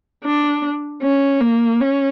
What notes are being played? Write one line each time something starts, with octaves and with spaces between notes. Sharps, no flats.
D4
C#4
A#3
C#4